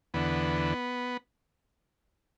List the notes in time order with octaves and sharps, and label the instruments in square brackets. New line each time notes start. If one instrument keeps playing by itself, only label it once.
[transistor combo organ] E2 D3 B3